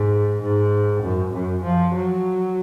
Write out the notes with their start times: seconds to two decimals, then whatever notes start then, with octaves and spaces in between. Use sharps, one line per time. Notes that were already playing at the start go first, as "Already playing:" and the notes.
Already playing: G#2
0.42 G#2
1.03 F#2
1.33 F#2
1.63 F3
1.95 F#3